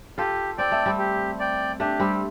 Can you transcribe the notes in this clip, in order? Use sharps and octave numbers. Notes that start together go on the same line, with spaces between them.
F4 G4 A4
C4 D5 G5
A3
G3 C4
G4
D5 G5
A3 D4 G4
G3 C4